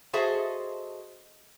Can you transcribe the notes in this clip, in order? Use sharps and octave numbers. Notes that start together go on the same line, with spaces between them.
F#4 G#4 A4 C5 D#5 E5